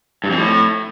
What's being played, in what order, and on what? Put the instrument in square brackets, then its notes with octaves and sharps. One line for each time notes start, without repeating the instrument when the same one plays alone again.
[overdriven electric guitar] G2
F2
A2